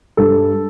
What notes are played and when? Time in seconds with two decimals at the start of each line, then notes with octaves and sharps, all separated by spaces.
0.17 G2 A4